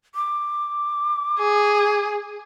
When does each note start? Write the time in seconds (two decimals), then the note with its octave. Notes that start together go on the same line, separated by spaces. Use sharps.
0.15 D6
1.39 G#4